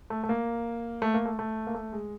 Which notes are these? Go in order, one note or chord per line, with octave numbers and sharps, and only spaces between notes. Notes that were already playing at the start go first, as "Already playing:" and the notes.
A3
A3
A#3
A3
A#3
A3
A3
A#3
A3
G#3